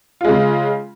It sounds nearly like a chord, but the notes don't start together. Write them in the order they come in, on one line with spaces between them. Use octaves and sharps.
F4 G#3 C#3